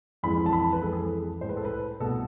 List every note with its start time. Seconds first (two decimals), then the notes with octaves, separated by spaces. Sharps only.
0.23 F2 E3 G#3 B5
0.46 A5
0.53 B5
0.63 A5
0.73 B4
0.82 F2 E3 G#3 A4
0.92 G#4
1.02 A4
1.41 A2 C5
1.44 G#3 B4
1.57 A4
1.65 B4
2.00 C2 B2 A3 A4